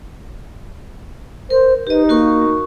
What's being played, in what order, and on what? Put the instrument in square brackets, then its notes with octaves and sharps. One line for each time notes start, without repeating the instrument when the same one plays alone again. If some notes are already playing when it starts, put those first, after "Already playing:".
[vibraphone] A#4 [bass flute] C5
[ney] D#4 [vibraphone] G4 D#5 [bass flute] B4
[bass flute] A#3 [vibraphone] F#4 A#4 C#6